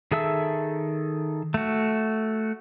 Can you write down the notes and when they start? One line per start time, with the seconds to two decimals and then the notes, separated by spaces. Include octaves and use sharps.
0.12 D#3 G#4 A4 E5 E6
1.54 A3 F#4